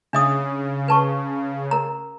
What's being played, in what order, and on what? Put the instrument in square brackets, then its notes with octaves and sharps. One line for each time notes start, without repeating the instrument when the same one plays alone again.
[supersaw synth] C#3 [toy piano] D4 E5 D#6
[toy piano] B4 A5 C#6
A#4 A#5